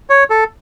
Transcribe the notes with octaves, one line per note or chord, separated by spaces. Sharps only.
C#5
A4